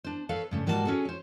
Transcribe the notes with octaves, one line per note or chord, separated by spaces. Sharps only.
D4 C5
A4 B4 C#5 F5
G2 C#3 A3
G#2 G3 A#3 F#4 C5 A5
C#4 D4 F#4 G#4 A4
C5 C#5